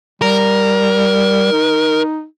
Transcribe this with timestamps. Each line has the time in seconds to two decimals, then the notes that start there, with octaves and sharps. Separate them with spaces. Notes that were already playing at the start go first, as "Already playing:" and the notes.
0.21 G3 A#4
1.52 D#4